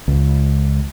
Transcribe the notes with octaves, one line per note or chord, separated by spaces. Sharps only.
C#2